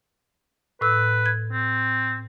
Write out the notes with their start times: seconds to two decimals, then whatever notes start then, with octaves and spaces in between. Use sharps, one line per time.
0.81 A2 B4 E6
1.26 G#6
1.52 C4